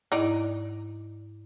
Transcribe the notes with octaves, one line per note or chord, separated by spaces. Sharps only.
G#2 D#4 E4 D5